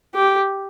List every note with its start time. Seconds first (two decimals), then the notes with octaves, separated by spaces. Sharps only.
0.15 G4